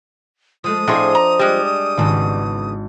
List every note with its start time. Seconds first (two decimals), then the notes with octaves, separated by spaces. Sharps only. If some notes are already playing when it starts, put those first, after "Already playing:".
0.64 F3 G#3 A3 D#6
0.88 A2 F3 C4 D4 F4 G#4 D#5 C6
1.15 A#5
1.39 G3 G#3 D5
1.97 G#1 C#3 E3 B3